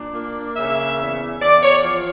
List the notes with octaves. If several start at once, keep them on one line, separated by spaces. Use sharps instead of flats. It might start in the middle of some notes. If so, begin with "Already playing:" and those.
Already playing: A#2 D4
A#3
C#3 E5
E2
E2 D5
C#5
F3